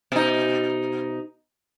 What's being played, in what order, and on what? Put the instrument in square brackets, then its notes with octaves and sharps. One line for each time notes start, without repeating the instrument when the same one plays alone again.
[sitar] B2 D#4